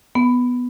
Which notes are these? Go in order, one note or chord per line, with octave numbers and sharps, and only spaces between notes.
B3